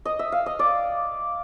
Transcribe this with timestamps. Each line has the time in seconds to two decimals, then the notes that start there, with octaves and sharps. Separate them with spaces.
0.05 D#5
0.19 E5
0.32 F5
0.46 D#5
0.59 D5